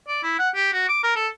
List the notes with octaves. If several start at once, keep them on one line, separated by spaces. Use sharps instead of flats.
D5
E4
F#5
G4
F#4
D6
A#4
A4